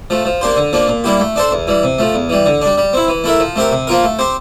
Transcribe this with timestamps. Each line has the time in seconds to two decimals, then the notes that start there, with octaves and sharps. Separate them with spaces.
0.10 F3 A3
0.25 F3
0.41 A#3 D4 G4 C5
0.56 D3
0.73 F3 A#3 D4
0.88 A#2
1.04 G3 A#3 E4 G4
1.20 A3
1.36 D4 A4 C5
1.51 E2
1.67 E3 G3
1.83 C3
1.99 F3 A3
2.14 E2
2.29 E3 G3
2.46 D3
2.61 G3 D4
2.78 G3
2.93 C4 E4
3.08 E3
3.24 A3 E4 A#4 E5
3.40 F3
3.56 A3 C4 G4 A#4
3.72 C3
3.87 F3 A#3 F4 A#4
4.03 A3
4.19 C4 G4 C5